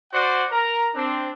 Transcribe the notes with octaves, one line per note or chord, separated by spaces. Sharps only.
F#4 C5 D5 F#5
A#4 A#5
C4 D4